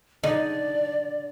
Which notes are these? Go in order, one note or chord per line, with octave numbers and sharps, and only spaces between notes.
D3 D#4 D5